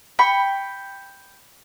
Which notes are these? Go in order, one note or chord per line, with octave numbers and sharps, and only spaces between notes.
G5 B5 C#6